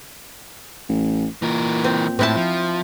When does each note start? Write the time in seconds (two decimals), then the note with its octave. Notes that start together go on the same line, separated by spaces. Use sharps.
0.89 A1
1.42 A#2 E3 A#4
1.84 C4
2.19 A2 C4 E4 A5
2.36 F3